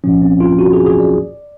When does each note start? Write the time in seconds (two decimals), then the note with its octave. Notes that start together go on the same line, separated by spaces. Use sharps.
0.04 C2 A#2 F3 C#4
0.22 C4
0.40 F4
0.59 F#4
0.73 G#4
0.86 G#4
1.00 D5